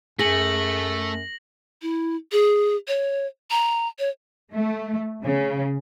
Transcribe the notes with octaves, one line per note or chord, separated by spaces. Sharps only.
F#2 A3 G#4 A#6 F#7
E4
G#4
C#5
A#5
C#5
A3
C#3